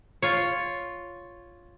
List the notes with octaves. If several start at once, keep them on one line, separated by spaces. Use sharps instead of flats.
F4 C#5